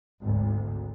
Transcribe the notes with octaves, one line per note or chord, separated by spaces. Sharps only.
G#1 D2